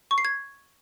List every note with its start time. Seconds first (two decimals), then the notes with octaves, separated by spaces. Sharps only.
0.11 C#6
0.18 C7
0.25 G#6